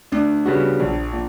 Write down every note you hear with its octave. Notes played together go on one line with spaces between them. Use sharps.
D2 D4
C#3 G3 B3 F#4
A#1
A#2